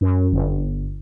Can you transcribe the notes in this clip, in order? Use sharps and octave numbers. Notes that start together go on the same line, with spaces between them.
F#2
G1